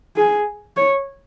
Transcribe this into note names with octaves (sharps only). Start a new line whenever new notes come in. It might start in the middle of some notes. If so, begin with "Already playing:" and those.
G#4
C#5